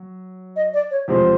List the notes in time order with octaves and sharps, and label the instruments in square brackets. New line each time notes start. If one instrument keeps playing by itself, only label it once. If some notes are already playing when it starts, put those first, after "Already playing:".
Already playing: [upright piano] F#3
[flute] D#5
D5
C#5
[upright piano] E2 C3 F3 G#3 [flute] C5